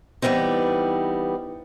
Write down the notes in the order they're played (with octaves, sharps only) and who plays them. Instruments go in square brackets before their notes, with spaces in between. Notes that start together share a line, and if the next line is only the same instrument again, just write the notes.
[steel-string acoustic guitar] E3 G3 B3 C4 D#4